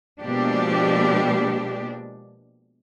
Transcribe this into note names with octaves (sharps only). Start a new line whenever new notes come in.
B2 F3 G#3 A#3 D4 G4